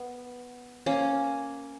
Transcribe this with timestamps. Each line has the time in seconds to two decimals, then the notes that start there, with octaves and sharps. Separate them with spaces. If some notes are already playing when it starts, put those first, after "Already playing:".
Already playing: B3
0.86 A#3 C#4